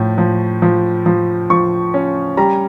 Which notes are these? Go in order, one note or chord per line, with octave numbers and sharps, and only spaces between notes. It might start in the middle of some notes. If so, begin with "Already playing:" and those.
Already playing: A2 F3
F3
F3
F3
F3 C#6
C#4
G3 A#5